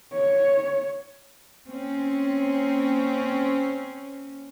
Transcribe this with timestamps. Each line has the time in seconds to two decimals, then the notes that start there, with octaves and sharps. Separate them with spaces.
0.13 C#5
1.66 A#3 C4 C#4